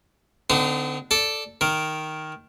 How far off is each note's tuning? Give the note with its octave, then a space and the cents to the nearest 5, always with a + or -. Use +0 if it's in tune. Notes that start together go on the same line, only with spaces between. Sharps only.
D3 +0 C4 -45 D#4 +0
A4 +0 D5 +0
D#3 +0 A#4 +0